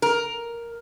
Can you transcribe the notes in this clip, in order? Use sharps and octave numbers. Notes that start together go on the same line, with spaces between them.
A#4